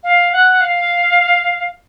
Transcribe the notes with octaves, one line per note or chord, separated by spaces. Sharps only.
F5
F#5
F5